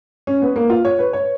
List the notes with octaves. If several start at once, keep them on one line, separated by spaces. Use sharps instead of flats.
C#4
B3
A#3
F4
C#5
B4
C#5